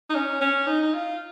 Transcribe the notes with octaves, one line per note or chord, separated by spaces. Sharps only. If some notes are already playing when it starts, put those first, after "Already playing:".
D#4
C#4
C#4
D#4
D#4
F4